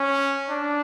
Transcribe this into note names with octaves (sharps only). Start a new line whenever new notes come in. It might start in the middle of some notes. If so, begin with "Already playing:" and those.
Already playing: C#4
D4